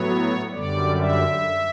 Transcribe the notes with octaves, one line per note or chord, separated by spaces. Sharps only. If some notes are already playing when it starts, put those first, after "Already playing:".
Already playing: A2 F#3 B3 C#5
F#2 D3 G3 D5
E5